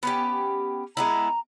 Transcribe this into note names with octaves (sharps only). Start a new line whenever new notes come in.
B3 C#4 G4
G#3 B3 E4 A#5